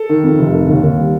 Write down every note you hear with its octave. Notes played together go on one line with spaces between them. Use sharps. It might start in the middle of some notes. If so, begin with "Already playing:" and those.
Already playing: A4
D#3
F2
F1
D#3
D#2
D#2
G3